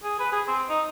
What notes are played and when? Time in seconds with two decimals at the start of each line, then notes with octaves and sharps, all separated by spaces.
0.03 G#4
0.19 B4
0.32 G#4
0.48 C4
0.69 D#4